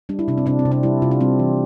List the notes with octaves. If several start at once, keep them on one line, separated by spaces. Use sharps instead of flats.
G3 D4
E4
C3 D4
C4
C3 D4
C4
C3
D4
G3 E4
C3 F4
D4
G3 C4
E3